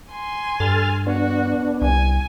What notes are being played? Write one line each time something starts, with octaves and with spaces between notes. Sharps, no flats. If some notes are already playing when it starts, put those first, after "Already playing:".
G#5 C6
G2 A4 F6 A6
B3 D4 F#4
C2 G#5